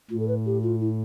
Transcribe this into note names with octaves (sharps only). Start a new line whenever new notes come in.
A2 F4
A4
B4
G4
F4
E4